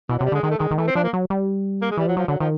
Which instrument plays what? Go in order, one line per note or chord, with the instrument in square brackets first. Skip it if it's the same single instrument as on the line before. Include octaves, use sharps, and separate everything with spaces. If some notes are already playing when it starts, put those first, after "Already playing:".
[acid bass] B2 [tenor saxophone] E3
[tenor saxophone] F#3
[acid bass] C3
[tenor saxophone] G3
[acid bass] D3 [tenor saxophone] G#3
[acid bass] D#3 [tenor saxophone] G#3
[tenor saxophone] A3
[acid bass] D#3 [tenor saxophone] G#3
[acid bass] D#3
[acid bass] E3 [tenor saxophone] A3
[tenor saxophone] C4
[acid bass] F3 [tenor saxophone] D4
[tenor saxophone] A#3
[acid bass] F#3
G3
[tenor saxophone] A#3
G#3
[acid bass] E3 [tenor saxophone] G3
[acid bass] F3 [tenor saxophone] F#3
[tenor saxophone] F3 [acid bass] F#3
[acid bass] D3 [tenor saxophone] F#3
[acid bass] D#3 [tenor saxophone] F3